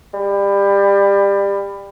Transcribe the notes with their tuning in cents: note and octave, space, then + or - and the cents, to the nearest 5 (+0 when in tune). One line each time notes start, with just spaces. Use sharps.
G3 +25